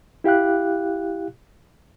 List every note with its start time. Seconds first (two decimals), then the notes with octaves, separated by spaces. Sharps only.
0.24 E4 G4 F5 G5 F#6